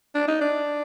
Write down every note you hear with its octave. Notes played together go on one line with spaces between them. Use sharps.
D4
D#4
D4